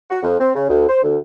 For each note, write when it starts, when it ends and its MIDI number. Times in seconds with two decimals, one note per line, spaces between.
0.10 0.19 66
0.23 0.38 41
0.39 0.51 60
0.55 0.68 49
0.69 0.88 38
0.88 1.01 72
1.03 1.17 38